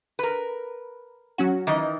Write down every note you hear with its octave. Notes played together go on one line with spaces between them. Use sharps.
A#4 B4
F#3 C#4 F#4
D#3 E3 D#4